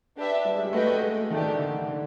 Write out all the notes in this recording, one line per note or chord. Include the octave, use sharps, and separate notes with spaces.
D4 G4 B4 E5
G3
G#3
G3
A3 F#4 B4 D#5 G5
A3
G#3
A3
D#3 A3 D4 G4
D#3
D3
D3
D3